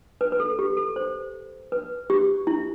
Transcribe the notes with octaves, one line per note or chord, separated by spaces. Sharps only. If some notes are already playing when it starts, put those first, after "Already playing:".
B4
B4
A4
G4
A4
C5
B4
G4
E4